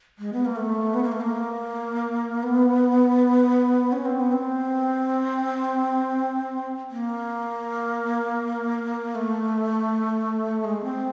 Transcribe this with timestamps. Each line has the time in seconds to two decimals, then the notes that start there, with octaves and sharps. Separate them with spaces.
0.19 G#3
0.33 B3
0.45 A#3
0.56 A3
0.94 B3
1.03 A#3
1.12 A3
1.21 A#3
2.43 B3
3.92 C#4
4.05 C4
4.20 B3
4.32 C4
6.91 A#3
9.15 A3
10.65 G#3
10.84 C4